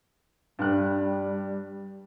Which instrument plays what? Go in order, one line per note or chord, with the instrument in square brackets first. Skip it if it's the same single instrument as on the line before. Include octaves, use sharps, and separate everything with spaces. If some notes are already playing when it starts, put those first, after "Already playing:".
[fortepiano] G2 F#6 [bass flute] G3